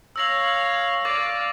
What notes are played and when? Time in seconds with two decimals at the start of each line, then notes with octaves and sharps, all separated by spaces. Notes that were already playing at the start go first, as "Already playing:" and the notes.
0.16 C#5 F5 E6 A#6 F#7
1.05 D5 F5 D6 A6